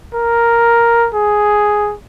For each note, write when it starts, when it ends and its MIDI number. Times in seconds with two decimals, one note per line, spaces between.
0.14 1.08 70
1.14 1.95 68